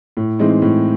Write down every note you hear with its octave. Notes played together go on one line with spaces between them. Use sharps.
A2
E3 G#3 C4 D#4
A2